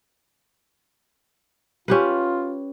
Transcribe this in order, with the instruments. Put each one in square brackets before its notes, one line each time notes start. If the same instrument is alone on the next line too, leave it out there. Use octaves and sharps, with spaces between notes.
[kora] C#4 G4 B4 [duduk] F4